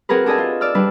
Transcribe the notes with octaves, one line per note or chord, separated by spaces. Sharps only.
C4 F#4 G#4 A#4 B4
D4 G#4 A4 D#5 G#5
F4
D5 E6 F6
G3 D4 B4